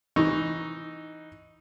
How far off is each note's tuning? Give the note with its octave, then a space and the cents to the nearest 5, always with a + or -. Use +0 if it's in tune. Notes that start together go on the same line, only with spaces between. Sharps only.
E3 -5 D#4 +0 C#6 +0